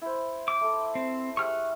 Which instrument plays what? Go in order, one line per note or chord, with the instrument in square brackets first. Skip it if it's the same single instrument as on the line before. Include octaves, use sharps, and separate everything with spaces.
[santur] E4 C5
[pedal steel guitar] D6
[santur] A3 A4
[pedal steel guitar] C4
[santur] G#3 G4 E5 [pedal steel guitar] C#6 F6 F#6